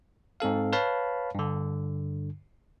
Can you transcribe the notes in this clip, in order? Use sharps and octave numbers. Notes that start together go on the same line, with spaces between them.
G#2 C4 A4 F5
B4 C#5 F5 A5 B5
G2 D3